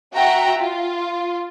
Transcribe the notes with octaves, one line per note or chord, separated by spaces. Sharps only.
F#4 E5 F#5 G5 A#5
F4